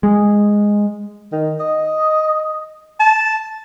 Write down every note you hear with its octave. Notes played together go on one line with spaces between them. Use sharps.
G#3
D#3
D#5
A5